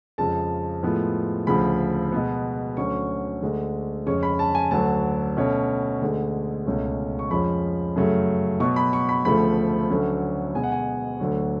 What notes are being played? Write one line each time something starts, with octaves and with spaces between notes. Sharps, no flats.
F2 C#3 F3 G#3 A5
A2 F3 G#3 B3
D2 C#3 F3 B5
B2 G#3 B3
D2 D3 F#3 C#4 C#6
D2 D3 G#3
F2 C#3 G#3 C#4 C#6
B5
A5
G#5
D2 D3 F#3 A5
B2 A3 C#4
D2 D3 G#3
C#2 B2 A3 C#4
C#6
F2 F3 G#3 C#4 B5
F#2 C#3 F#3 A3
B2 F#3 B3 C#6
B5
C#6
B5
D2 C#3 F3 A3 B5
D2 D3 F#3 A3 C#4
B2 G#3 B3 G#5
F#5
G#5
D2 D3 F#3